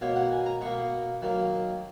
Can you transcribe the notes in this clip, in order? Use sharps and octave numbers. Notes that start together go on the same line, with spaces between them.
B2 A#3 C#5
F#5
G#5
A#5
B2 A#3 C#6
D#3 F#3 A#3